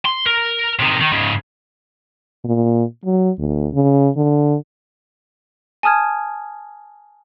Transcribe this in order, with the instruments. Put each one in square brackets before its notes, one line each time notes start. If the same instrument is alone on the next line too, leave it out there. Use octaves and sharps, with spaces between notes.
[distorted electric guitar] C6
A#4
C3 D#3
D#3
G#2 C#3
[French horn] A#2
F#3
D2
C#3
D3
[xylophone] G#5 A5 D#6 F6 G#6